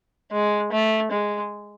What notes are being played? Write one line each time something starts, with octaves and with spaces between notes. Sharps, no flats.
G#3
A3
G#3